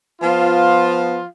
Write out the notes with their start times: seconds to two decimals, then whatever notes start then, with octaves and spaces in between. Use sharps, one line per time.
0.21 F3 B3 F4